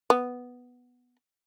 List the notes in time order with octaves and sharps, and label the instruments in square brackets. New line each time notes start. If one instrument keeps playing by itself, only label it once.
[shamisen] B3